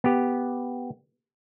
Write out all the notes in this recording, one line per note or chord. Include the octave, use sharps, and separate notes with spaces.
B3 G4